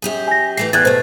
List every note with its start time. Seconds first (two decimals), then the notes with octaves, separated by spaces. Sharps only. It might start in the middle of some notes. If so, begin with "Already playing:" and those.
0.02 F#2 G4 G#4
0.28 G#5 A#6
0.57 E3 A3 G4 C7
0.73 E2 G4 D5 F#6 G#6 A6
0.85 B2 A3 C5